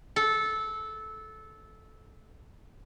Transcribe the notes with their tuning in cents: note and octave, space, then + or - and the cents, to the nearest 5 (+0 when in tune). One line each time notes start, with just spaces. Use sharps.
A4 -15